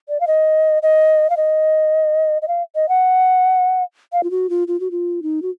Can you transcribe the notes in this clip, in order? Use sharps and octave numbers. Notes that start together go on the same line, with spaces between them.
D5
F5
D#5
D#5
F5
D#5
D#5
F5
D#5
F#5
F5
F4
F#4
F4
F4
F#4
F4
D#4
F#4